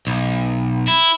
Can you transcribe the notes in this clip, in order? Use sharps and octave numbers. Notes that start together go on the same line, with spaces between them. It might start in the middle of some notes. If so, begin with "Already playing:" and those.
B1
E4